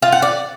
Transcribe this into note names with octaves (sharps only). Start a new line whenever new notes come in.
F4
F#5
D5